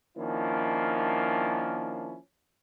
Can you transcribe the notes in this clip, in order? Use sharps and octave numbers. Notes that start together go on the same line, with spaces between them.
D#3 F3 A#3 C#4 D4 E4